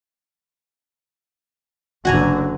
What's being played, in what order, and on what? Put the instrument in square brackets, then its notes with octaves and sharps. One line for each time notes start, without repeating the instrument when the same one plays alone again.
[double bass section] F#1 D3 [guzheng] F#4 G#5 A#5